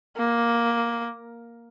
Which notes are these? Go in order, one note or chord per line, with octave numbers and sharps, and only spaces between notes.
A#3